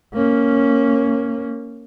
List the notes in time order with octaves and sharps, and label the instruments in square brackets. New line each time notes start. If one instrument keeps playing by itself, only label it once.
[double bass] A#3 C#4